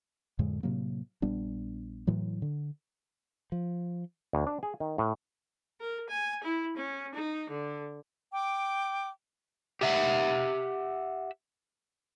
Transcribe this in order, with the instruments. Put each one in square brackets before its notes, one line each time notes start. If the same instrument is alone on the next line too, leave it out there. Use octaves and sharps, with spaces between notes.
[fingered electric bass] F2 A2 D3 G#3
A2 C3 F#3 A#3
A#1 G3 B3 D4
A2 E3 F#3
D3
F3
[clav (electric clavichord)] D2
D4
G#4
D#3
A2
[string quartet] A#4
G#5
E4
C#4
D#4
D3
[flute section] G5 D6
[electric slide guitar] G4 E5 F#5